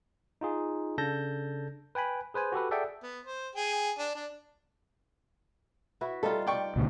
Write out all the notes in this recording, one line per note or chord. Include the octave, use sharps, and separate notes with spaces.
D#4 F4 G#4
C#3 D4 A4 A5 G6 A#6
B4 G5 G#5 B5
G#4 B4 C5 G#5
F#4 G4 A4 B4
G#4 A4 D5 E5 F#5 G5
B3
C5
G#4 G5
D4
D4
E4 F#4 B4
G3 D#4 F4 A4
D5 G5 C#6
C#2 A#2 D3